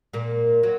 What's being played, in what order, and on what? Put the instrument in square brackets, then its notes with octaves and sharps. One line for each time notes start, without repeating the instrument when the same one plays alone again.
[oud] A#2 A#3
F#3